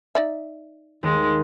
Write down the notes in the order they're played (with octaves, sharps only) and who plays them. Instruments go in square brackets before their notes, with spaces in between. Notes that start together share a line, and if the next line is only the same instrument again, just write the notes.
[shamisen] D#4 D5 E5
[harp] D#2 [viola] G#3